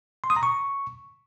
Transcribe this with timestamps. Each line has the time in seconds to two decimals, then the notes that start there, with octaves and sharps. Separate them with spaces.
0.24 C6
0.30 D#6
0.36 A#5
0.43 C#6